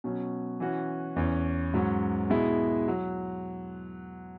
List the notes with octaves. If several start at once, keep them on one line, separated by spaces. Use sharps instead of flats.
B2 F#3 C#4
E3 C#4 F#4
E2 E3 C#4
G#2 F#3 C#4
B2 G#3 E4
F#3